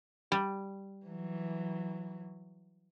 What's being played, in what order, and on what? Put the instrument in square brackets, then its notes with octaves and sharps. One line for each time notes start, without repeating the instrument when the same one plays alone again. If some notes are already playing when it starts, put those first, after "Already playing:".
[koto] G3
[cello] E3 F#3